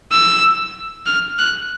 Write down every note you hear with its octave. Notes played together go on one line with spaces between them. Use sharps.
E6
F6
F#6